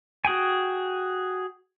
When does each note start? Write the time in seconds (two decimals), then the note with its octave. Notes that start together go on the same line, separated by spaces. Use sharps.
0.25 F#4 G#4 G5 G#5